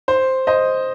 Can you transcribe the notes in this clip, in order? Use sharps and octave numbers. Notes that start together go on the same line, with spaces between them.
C5
C5 D#5